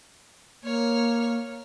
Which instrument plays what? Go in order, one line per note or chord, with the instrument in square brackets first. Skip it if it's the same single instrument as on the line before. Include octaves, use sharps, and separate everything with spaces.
[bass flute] A#3 [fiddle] C#5 F6